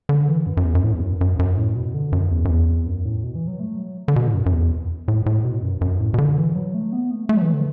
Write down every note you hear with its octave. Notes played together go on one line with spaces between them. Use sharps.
D3
E3
F#2
F#2
E2
F#2
A2
E2
F#2
F#2
F#2
A2
B2
D3
F#2
E2
F#2
E2
F#2
A2
B2
E3
F#3
A3
F#3
D3
B2
A2
F#2
F#2
E2
A2
A2
B2
F#2
F#2
A2
B2
D3
E3
F#3
A3
B3
A3
A3
F#3
E3
D3